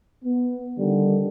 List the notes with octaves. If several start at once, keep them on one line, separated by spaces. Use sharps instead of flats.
B3
D3 D#3 G3